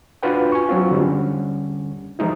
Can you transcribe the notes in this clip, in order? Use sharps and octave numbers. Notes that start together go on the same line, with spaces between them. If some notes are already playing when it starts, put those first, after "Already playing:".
D4 F4 F#4 B4 G5
G#5 C#6
F#3 C4 F4
D3 G3 C#4
E3 F3 G#3 D#4 E4